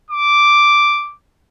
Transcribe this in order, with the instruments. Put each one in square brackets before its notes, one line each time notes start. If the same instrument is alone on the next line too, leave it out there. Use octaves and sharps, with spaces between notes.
[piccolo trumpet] D6